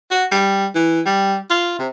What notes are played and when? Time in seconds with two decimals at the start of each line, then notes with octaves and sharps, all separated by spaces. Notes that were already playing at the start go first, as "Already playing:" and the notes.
0.11 F#4
0.31 G3
0.75 E3
1.06 G3
1.50 F4
1.79 C3